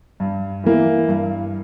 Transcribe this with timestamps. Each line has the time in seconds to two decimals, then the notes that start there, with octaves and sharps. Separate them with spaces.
0.20 G2
0.64 E3 A#3 E4
1.08 G2